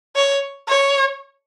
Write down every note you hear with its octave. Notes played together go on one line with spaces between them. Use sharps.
C#5
C#5